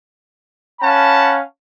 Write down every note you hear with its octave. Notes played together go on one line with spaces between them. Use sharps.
C#4 F5 F#5 A5 B5